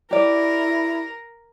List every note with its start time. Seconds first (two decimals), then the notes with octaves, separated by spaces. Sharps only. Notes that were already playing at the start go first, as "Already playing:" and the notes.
0.11 E4 G4 A#4 D5